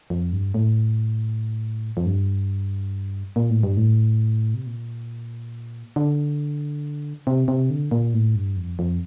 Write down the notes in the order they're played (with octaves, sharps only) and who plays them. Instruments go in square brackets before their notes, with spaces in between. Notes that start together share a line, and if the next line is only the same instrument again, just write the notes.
[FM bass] F2
G2
A2
F2
G2
A#2
A2
G2
A2
C3
A#2
D3
C3
C3
D3
A#2
A2
G2
F2
F2